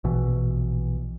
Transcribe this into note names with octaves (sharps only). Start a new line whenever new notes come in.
A#1 B2 E3